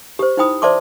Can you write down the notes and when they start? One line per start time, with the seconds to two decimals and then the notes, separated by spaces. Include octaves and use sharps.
0.19 G4 C5
0.37 D#4 E4 C5 G5 B5 D#6
0.62 C5 D5 E5 A5 C6 D6